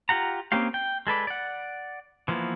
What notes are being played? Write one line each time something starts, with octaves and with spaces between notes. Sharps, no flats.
F4 G4 F#5 A#5
A#3 C4 C#4 G4 F5
G5
G#3 A4 B4 D5
D5 F#5
E3 F3 A#3 B3